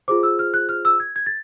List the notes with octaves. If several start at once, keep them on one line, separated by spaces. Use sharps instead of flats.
F4 G#4 C5 D6
E6
F6
F#6
F6
E6
G#6
G#6
A6